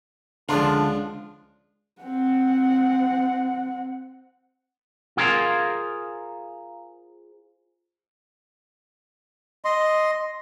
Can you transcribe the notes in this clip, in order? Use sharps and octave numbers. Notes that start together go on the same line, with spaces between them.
C#2 D3 F3 D4 F4
C4 F#5
F4 G#4 A#4 C5 F5
D#5 C6